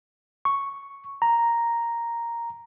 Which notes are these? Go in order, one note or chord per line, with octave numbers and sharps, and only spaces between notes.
C#6
A#5